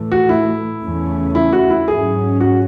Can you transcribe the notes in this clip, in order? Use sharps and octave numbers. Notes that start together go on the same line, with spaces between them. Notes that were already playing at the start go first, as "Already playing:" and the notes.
Already playing: A2 E3 A3
F#4
E4
E2 C#3 E3 A3 C#4
E4
F#4
E4
G#2 F#3 C#4 G#4
F#4